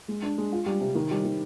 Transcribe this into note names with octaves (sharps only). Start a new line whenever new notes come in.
G#3
D4
G#3
F4
G3
C3
D#3
G3
D#3